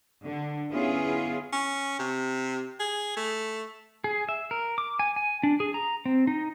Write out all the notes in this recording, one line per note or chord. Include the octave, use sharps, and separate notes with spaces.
D3
B3 C#4 E4 F4 G#4
C#4
C3
G#4
A3
G#4
E5
A#4
D6
G#5
G#5
D4
G#4
A#5
C4
D#4